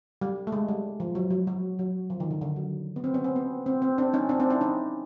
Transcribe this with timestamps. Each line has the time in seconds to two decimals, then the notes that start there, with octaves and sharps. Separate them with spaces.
0.21 G3
0.47 A3
0.52 G#3
0.68 G3
1.00 F3
1.15 F#3
1.31 F#3
1.47 F#3
1.79 F#3
2.10 F3
2.20 D#3
2.31 D3
2.41 D3
2.56 F#3
2.96 B3
3.04 C4
3.14 B3 C#4
3.24 C4
3.36 B3
3.66 C4
3.82 C4
3.98 C4 D4
4.13 C#4 D#4
4.29 C4 D4
4.40 C4 D4
4.50 D4 E4
4.61 C#4 D#4